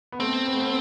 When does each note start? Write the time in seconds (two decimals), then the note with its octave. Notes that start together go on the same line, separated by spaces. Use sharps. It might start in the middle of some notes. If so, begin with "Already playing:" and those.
0.12 B3
0.20 A3 C4
0.46 B3
0.53 A3
0.60 B3